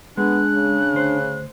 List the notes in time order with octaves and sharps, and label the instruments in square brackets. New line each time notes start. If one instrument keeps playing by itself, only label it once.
[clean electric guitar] G#3 [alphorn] B3 [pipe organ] D4 [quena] F#6
[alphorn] C#3
[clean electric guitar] D2 C5